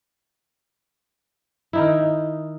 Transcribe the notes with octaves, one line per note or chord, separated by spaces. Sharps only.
D#3 D#4 E4